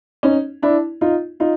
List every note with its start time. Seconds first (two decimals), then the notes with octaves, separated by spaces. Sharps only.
0.23 C#4 D#4
0.62 D4 E4
1.01 D#4 F4
1.40 D#4 F4